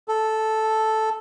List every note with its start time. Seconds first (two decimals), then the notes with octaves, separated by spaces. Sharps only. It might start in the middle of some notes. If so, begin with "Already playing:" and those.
0.08 A4